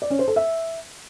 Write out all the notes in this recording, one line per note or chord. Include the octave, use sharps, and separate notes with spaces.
D5
C#4
C5
A4
E5